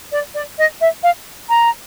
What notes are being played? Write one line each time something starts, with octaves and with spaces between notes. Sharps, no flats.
D5
D5
D#5
E5
F5
A#5